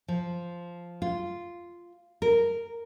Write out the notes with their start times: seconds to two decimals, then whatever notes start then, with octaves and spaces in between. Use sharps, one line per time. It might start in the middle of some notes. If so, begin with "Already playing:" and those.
0.08 F3
1.02 F4
2.22 A#4